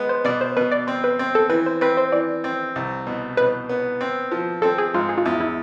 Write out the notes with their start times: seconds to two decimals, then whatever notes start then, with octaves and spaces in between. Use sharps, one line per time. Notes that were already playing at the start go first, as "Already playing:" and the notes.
Already playing: G#3 B3
0.09 C5
0.25 B2 D5
0.41 C5
0.57 B2 B4
0.72 D5
0.87 C4 C5
1.04 B4
1.19 C4
1.35 A4
1.50 E3 B4
1.66 C5
1.81 C4 B4
1.97 C5
2.12 E3 D5
2.44 C4
2.76 C2
3.07 B2
3.37 B2 B4
3.69 B3
4.01 C4
4.32 F3
4.62 C4 A4
4.78 G#4
4.94 G#2 F4
5.09 G#4
5.18 F4
5.25 E2 E4
5.40 E4